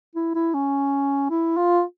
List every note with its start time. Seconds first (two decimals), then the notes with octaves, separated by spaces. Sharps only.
0.16 E4
0.35 E4
0.54 C#4
1.30 E4
1.57 F4